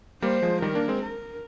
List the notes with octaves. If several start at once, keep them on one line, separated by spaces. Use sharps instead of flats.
G3 A#3 C5
F3 G#3
D#3 G3 A#4
A#3 D4
G#3 C4
A#4